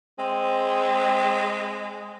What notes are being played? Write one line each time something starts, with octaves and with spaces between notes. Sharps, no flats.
G#3 C4